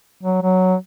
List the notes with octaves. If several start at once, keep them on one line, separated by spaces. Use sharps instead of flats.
F#3
F#3